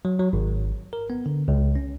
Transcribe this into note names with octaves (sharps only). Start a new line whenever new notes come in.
F#3
F#3
G#1
A#4
B3
D3
C#2
C#4